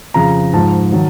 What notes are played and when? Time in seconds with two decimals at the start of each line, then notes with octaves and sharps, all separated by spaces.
0.14 F2 C#3 F3 A#5
0.53 G#2 F3 A5
0.92 D#3 F#3